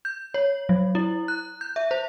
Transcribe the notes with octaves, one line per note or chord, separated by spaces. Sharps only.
G6
C#5
F#3
E4
F#6
G6
E5
C5